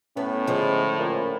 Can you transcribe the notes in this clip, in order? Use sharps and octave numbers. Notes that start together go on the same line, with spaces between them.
A2 B3 C#4
D3 F3 G#3
A#2 C#4